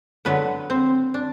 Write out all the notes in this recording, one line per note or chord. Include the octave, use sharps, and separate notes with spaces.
D3 F#3 B3 B4
C4
D4